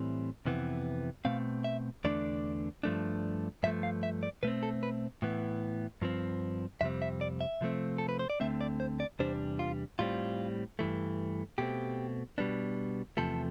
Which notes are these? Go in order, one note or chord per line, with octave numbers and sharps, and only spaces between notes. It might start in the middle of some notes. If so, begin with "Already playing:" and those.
Already playing: A2 E3 G3 C4
F2 C3 E3 B3
B2 A3 C4 F5
E5
E2 D3 A3 D4 D5
G2 F3 A3 D4
G2 F3 A3 E5
F5
E5
D5
B2 A3 C4 B4
A4
B4
A2 E3 B3
G2 F3 C4
F2 C3 G3 C4 E5
E5
D5
E5
C3 F3 A3 C4
A4
B4
C5
D5
D2 D3 A3 C4 E5
D5
C5
D5
E2 C3 G3 D4 C5
F4
A2 G3 C4 F4
G2 E3 A3
B2 A3 C4 G4
B2 G3 B3 D4
E2 C3 F3 A3 A4